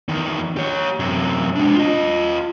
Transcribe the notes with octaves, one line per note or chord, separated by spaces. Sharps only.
E2 D#3
G4 C#5
F#2 C3
G#3 D4
F4 D#5